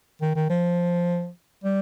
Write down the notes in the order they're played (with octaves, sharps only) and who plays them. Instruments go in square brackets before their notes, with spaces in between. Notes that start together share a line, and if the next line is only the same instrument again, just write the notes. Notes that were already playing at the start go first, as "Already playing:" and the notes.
[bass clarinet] D#3
D#3
F3
G3